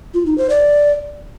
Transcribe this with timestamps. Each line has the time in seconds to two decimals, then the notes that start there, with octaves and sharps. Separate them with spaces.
0.14 F4
0.26 D#4
0.38 C5
0.50 D5